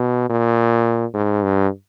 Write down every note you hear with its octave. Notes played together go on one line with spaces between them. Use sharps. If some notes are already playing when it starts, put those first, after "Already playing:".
Already playing: B2
A#2
G#2
G2